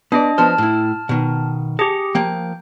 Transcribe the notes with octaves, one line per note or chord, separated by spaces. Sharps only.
B3 D4 D5 D#5
F3 B3 C5 A5 F6
A2 E4
B2 D#3
G4 G#4 A5
F3 A#3 G5